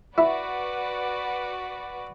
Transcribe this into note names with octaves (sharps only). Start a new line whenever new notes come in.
E4 F#4 B4 D5